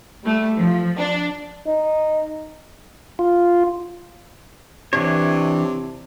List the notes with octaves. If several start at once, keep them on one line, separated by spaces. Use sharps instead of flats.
G3 A3
F3
D4
D#4
F4
C3 E3 D4 C#5